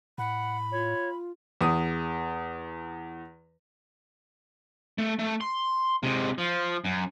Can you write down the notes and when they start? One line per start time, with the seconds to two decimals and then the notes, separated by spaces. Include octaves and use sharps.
0.18 A2 F#5 B5
0.71 F4 C#5
1.61 E2 D#6
4.98 A3
5.19 A3
5.41 C6
6.03 C3 G#3
6.38 F3
6.85 F#2